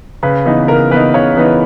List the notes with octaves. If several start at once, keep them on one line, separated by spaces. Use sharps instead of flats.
C#3 B4
E3 B3 D#4
C#3 A#4
E3 B3 D#4 B4
C#3 C#5
E3 B3 D#4